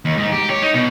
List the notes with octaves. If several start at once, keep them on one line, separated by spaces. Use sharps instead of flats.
D#2
G#2
G4
C#5
D#4
B2